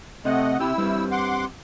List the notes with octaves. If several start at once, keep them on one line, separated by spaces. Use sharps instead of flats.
C3 A3 D#5 F#5
C3 E4 G4 G5 E6
G2 G3 C4
F#5 C6 D6